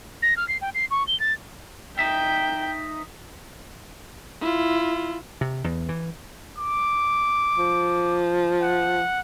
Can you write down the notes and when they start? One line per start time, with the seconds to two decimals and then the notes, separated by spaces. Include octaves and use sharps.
0.22 A#6
0.37 F6
0.48 C7
0.61 G5
0.74 C7
0.91 C#6
1.07 G7
1.20 A6
1.99 D#4 E5 G5
4.41 E4 F4
5.41 C3
5.64 E2
5.89 E3
6.59 D6
7.58 F3
8.62 F#5